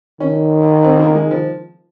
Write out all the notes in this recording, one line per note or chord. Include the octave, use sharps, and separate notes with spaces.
D#3 C#4
C4
A#3
G#3
F3